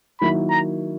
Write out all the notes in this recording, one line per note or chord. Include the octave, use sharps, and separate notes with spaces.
D#3 F#3 A#3 E4 B5
A#5